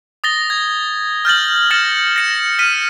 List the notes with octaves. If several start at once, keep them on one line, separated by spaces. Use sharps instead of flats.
D#6 A6 A#6 G7
G#6
F6 G6 A6 F#7
F6 A6 A#6 C#7 E7
A#6 C#7 E7
F6 B6 D#7